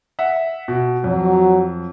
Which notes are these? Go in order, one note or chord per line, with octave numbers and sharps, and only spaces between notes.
E5 F#5
B2
F2 F#3